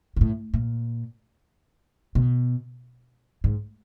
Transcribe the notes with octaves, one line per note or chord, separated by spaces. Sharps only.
A#2
A2
A#2
B2
G#2